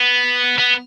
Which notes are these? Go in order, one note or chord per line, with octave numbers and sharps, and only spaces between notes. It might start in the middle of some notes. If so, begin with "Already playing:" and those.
Already playing: B3
B3